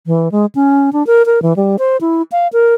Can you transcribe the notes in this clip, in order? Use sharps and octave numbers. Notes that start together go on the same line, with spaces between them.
E3
G#3
C#4
D4
A#4
A#4
E3
G3
C5
E4
F5
A#4